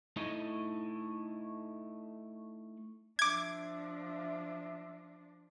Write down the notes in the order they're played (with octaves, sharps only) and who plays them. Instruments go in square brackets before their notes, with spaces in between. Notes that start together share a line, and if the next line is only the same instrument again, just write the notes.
[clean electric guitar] A3 D#4 E4 D#5
[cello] F3 D4 [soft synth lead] E5 [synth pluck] D6 G#6